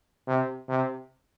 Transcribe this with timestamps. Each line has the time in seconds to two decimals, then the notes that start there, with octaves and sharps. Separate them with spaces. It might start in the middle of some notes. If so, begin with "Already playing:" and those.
0.27 C3
0.69 C3